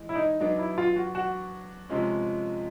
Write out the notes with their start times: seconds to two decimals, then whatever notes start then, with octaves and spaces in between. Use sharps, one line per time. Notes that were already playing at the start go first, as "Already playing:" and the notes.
Already playing: E3 G#3
0.09 E4
0.16 D#4
0.40 F#3 B3 D4 D#4
0.58 E4
0.78 F4
0.96 F#4
1.15 F#4
1.89 C3 F3 G#3 C#4